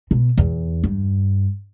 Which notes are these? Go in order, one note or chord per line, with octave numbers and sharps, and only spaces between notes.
B2
E2
G2